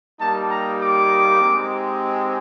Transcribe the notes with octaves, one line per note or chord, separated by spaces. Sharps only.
G3 A#3 D#4 G4 A5
A#5
D6
G#3 C4 D#4 G4